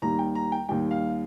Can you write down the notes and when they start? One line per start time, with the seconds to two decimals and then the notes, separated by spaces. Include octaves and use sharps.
0.02 D#2 D#3 G3 A#5
0.19 G5
0.35 A#5
0.52 G5
0.69 D#2 D#3 G3 G5
0.91 F5